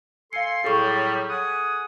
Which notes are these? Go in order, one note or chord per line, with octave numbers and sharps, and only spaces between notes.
A4 F5 G#5 C6 C#7
A2 F#3 G3 G#4 A4 C#6
F#5 G#5 D#6